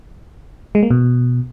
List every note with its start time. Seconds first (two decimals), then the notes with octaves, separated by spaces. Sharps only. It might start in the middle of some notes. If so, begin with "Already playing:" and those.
0.75 G#3
0.83 A#3
0.90 B2